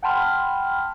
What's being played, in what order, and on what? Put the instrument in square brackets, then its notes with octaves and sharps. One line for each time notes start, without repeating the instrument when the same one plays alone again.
[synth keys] F#5 G5 A5 B5 C6 F6